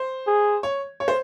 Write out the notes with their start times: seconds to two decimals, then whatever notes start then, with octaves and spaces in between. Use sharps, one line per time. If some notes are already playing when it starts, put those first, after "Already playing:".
Already playing: C5
0.27 G#4
0.63 C#5
1.00 C#5
1.08 C5